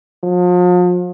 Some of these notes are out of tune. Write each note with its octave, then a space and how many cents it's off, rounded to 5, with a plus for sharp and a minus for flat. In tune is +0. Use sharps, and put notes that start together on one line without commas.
F3 +40